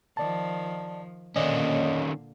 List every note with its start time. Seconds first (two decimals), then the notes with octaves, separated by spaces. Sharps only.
0.17 D#3 F3 D5 A5
1.36 A#2 D3 D#3 A#3 C#4 D5 D#5